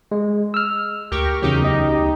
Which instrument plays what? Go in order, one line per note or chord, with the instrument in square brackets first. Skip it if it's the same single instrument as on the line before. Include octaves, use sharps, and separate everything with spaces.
[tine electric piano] G#3
E6 F6
[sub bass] D2 [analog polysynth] G4 A#4 C#6
[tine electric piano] E2 C#3 F#3 [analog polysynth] D#4 G4
[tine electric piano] D#5